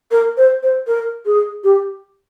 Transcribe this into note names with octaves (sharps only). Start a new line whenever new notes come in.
A#4
C5
C5
A#4
G#4
G4